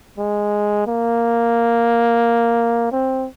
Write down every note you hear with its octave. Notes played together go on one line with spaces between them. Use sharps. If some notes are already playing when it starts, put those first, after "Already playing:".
G#3
A#3
C4